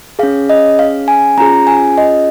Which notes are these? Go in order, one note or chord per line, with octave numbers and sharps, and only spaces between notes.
C#4 G#4 F5
D#5
F5
G#5
C#4 F4 G#4 A#5
G#5
D#5